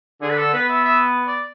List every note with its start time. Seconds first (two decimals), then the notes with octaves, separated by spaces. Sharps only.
0.21 D3 G#4
0.30 B4
0.38 A4
0.53 B3 B4
0.69 E5
0.85 E5
1.27 D5